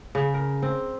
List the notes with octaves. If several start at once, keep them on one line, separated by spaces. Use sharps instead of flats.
C#3
A#4
C4